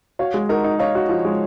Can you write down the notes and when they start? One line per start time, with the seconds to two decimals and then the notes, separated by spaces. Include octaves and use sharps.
0.19 F#4 C#5 F5
0.34 G#3
0.49 D#4 F#4 A#4
0.64 D#4
0.79 D#4 C#5 F5
0.95 F#4
1.09 F3
1.25 G#3